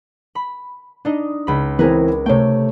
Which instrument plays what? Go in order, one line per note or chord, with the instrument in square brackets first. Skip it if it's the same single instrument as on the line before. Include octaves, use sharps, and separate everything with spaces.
[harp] B5
D4 D#4 D#5
C#2 B5
[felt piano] E3 C4 [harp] G#4 A#4 B4
[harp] C3 G5 [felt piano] A3 A4 C#5